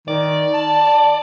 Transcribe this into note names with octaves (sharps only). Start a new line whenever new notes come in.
D#3 D5
A5